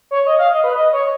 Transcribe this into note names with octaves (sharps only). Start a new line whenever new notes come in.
C#5
D#5
F5
D#5
B4
D#5
C#5